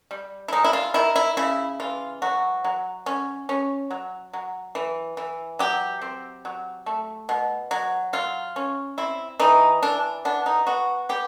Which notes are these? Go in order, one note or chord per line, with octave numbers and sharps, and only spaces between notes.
G3
E4
G#3 D#4
E4
F4
D#3 E4
E4
C#3 E4
E3 F4
F#3 F#4
F#3
C#4
C#4
F#3
F#3
E3
E3
F#3 G4
C4
F#3
A3
B2
F#3
F#3 F4
C#4
C4 E4
E3 D#4
E3 D4
B3 D4
D#4
B3 F#4
B3 G4